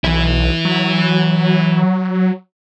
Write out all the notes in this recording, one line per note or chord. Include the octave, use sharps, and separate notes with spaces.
B1 E3 E4
F#3